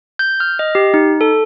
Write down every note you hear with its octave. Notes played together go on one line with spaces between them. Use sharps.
G6
F6
D#5
G4
D#4
A4